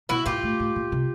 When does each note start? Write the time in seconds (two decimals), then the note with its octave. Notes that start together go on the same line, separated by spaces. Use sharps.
0.09 B2 E4 F#4
0.26 A#2 F4 G4
0.43 A2
0.60 A2
0.76 A#2
0.92 C3